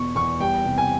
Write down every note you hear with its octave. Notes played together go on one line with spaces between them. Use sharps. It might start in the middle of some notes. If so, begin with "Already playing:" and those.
Already playing: E2 B2 C#6
E2 C#6
G3 G5
C3
G#5